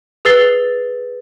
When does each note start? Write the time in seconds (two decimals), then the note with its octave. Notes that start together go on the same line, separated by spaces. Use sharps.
0.25 G#4 B4 E6 A6 C7 G7